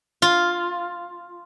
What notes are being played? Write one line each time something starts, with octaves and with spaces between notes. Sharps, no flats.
F4